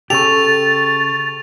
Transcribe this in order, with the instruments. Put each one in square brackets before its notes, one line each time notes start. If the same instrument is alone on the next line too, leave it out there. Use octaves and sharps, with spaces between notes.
[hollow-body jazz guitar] C#3 G4 [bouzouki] A4 [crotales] C#6 F7 [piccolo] A6